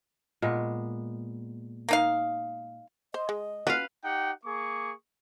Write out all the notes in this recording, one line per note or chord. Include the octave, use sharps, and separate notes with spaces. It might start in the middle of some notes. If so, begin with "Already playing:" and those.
A#2 G#3 B3
A#3 D#4 F5
C5 D#5
G#3
C#4 F4 F#4 B4 F5
D#4 G4 F#5 G5
A#3 G#4 C#6 D6